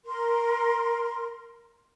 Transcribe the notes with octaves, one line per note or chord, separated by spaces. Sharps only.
A#4 C6